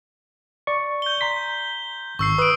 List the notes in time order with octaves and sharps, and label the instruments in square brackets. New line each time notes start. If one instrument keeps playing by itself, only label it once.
[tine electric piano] D5 C#6
[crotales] G6 G7
[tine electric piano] A#5 C6 B6
[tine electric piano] G#1 [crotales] C#6 E6 C7
[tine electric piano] B4 [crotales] D#6 D7